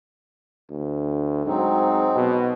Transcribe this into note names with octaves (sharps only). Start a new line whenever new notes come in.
D2
G#2 F#3 C4 D#4
B2